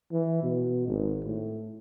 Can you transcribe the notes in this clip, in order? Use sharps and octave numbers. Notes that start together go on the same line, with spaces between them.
E3
B2
G#1
A2